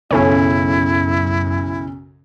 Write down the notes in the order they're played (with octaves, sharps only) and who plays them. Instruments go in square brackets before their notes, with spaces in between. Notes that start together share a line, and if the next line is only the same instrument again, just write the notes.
[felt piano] B1 C#3 G#5 [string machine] F#2 [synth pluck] C#4 A4 C#5 [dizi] E4